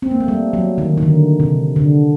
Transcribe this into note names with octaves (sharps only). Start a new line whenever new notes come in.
C4
A#3
A3
G3
F#3
D#3
D#3
D3
C3
D3